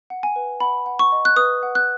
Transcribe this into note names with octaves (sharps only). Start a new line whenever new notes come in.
F#5
G#5
B4
F#5 B5
F#5
C#6
D#5
F#6
B4 D#6
F#5
F#6